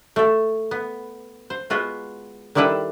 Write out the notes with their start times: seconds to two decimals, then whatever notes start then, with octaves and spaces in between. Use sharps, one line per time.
0.16 A3 A4
0.71 B3
1.50 C5
1.70 G#3 B3 F4 F#4
2.55 D#3 G3 D4 E4 A4 B4